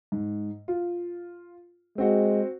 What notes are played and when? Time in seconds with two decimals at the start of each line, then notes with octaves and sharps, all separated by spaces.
0.12 G#2
0.68 F4
1.98 G#3 C4 F#4 C5